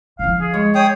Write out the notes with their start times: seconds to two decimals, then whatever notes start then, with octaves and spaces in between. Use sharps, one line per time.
0.19 F3 E4 F5
0.41 G#4
0.54 G#3 C#5
0.75 G#4 C#5 G5 D#6